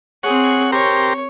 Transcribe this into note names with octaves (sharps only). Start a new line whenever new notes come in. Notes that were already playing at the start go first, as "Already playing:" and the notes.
C4 G#4 C#5 F#5
G4 A#4 C5 C#5